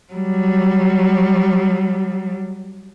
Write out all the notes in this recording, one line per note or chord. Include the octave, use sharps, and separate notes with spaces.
F#3 G3